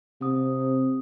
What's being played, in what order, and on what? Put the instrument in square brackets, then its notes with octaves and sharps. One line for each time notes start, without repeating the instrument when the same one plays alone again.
[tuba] C3 [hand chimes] C4 D#6